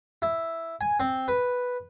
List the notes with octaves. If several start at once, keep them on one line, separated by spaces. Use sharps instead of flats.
E4
G#5
C4
B4